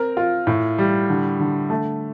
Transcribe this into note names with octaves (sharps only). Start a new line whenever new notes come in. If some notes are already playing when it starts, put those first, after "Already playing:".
Already playing: C4 A#4
F4
A2
G3
D3
D3
A3